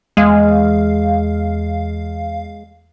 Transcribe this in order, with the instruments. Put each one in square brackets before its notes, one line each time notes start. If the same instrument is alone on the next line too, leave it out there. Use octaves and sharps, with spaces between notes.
[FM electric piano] E2 F5 [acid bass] G#3